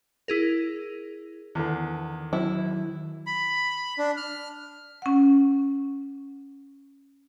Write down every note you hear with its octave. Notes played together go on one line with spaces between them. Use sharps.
E4 G#4 A#4
E2 D3 D#3
F#3 E4
B5
D4
F6
C#4 F#5